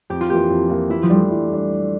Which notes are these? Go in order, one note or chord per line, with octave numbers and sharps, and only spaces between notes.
F2 G4
F4
E3 A#3 G4
F2
E3 A#3
E3 E4
F3
G3 A3 D4
E3
A3 D4